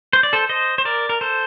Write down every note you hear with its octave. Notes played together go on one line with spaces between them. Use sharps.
C5
D5
A4 C5
C5 D#5
C5
A#4 D5
A#4
A4 C5